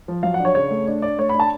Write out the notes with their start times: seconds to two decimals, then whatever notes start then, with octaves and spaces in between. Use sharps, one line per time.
0.08 F3
0.23 F#3 F5
0.34 F#5
0.39 D4
0.45 C#5
0.55 C#3 C#5
0.71 A3
0.88 D4
1.02 D4 D5
1.18 A3 C#5
1.29 B5
1.34 D4
1.40 A5